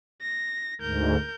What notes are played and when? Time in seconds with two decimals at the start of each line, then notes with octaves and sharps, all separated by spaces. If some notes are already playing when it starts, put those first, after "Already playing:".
0.21 A#6
0.81 D2 G#2 A#4 G6